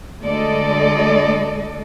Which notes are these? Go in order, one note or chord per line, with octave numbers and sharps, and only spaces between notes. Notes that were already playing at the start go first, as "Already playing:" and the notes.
D2 G#3 A4 D5 D#5